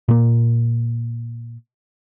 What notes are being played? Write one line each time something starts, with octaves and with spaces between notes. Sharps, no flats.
A#2 A#3